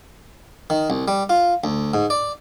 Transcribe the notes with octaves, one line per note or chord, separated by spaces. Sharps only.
D#3
C2
G3
F4
D2
G#2
D5